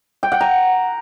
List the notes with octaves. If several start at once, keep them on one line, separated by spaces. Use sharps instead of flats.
G5
F#5
A#5